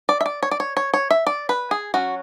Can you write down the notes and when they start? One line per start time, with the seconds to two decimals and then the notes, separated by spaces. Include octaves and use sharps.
0.09 D5
0.21 E5
0.26 D5
0.43 C#5
0.51 D5
0.60 C#5
0.77 C#5
0.94 C#5
1.11 E5
1.27 D5
1.49 B4
1.71 G#4
1.94 F#3 C#4 F#4